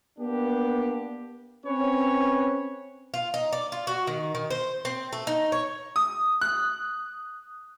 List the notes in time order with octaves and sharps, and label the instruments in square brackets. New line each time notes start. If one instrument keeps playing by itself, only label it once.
[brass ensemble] A#3 B3 D4 G4
C4 C#4 B4 C#5
[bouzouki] F4
D#4
D5
F4
F#4
D#3
D#3
C5
C4
A3
D#4
C#5
[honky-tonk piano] D#6
F#6